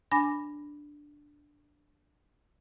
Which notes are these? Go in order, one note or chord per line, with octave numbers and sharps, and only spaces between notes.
D4 G#5 B5 D6 A#6